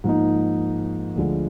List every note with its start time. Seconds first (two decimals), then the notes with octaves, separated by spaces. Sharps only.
0.04 G#2 F3 A#3 D#4
1.16 D2 D3 F3 G#3